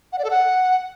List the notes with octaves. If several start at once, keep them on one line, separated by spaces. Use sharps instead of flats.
F#5
D5
A4
F#5